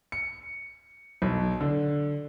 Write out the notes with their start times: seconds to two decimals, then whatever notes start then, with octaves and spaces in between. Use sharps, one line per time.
0.12 C#7
1.22 B1
1.61 D3